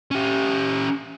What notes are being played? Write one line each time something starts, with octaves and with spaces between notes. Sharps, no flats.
C#4 G4